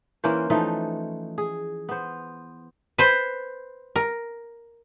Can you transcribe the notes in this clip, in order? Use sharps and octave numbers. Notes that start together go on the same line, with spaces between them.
E3 A#3 C#4 C5
E3 F3 A3 D#4
G#4
B3 C5
B4 C5
A#4